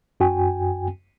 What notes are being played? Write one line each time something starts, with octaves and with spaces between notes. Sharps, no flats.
F#2 F#4 G5 G#5